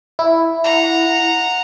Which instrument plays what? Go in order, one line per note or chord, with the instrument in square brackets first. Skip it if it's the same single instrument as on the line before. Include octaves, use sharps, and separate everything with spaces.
[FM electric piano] E4
[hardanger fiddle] F#5 A#5